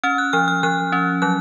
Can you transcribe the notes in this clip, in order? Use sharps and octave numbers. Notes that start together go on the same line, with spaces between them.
C#4 F6
F#6
F3 F6
F6
F3 F#6
C#4
F#3 F#6